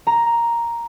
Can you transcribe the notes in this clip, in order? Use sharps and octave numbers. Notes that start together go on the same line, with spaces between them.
A#5